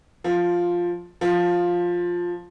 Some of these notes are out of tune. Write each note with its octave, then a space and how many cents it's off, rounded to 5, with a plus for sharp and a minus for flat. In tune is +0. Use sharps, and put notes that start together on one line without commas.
F3 +0
F3 +5